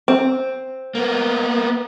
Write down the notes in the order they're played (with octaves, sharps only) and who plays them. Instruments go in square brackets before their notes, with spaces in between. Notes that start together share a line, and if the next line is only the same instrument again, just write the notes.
[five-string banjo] C4
[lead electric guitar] A#3 B3